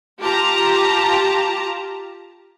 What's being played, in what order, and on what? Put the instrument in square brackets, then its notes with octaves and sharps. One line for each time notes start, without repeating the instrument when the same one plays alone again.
[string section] F4 G4 A5 A#5